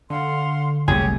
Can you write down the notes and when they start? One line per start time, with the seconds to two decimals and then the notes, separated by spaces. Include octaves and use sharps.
0.10 D3 F5 F#5 C6
0.88 F#1 C2 A3 G4 G#4 C#5 G#5